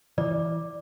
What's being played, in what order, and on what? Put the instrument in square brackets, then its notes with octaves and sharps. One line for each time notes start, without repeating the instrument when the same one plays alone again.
[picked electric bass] E3 [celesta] D5